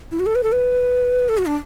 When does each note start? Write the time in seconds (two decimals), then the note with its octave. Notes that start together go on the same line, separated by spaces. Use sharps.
0.12 E4
0.20 F#4
0.26 A4
0.35 B4
0.43 A4
0.52 B4
1.29 A4
1.38 F#4
1.46 D4